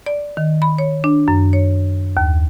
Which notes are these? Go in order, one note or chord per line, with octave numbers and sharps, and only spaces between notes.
D5
D#3
B5
C#5
D4
F#2
C#5
D#2